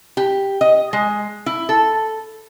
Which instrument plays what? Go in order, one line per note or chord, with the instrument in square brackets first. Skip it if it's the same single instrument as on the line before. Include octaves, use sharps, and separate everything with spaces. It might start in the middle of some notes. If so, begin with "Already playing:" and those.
[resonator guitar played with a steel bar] G4
D#5
G#3
E4
A4